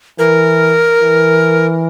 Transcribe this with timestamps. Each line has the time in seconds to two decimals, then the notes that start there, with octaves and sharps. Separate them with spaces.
0.19 E3 A#4
1.01 E3